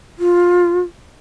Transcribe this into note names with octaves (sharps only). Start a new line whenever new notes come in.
F4